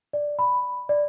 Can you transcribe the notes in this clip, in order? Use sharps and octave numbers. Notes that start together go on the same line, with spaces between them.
D5
B5
D5